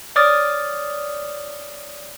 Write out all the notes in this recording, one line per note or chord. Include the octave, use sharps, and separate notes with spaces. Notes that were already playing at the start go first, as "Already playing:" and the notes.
C#5 D5 D6 D#6 F6 A6